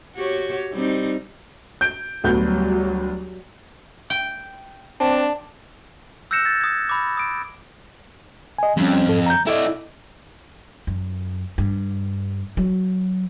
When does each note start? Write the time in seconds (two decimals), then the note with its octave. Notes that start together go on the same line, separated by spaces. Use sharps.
0.16 F#4 G4 C#5
0.72 G3 C4 D#4
1.81 G6 D7
2.24 D2 F#3 G3 B3 G6
4.10 G5
5.00 C4 D4 A5
6.31 E6 F#6 G6 A#6 C#7 E7
6.45 G#6 A6
6.61 D#6 G#6
6.89 B5 D6
7.17 D#6 D7
8.58 D#5 G#5
8.77 F2 G3 C#4
9.07 G#2 A4
9.26 A#5 G6
9.47 E4 A4 D5 D#5
10.87 F#2
11.58 G2
12.57 F#3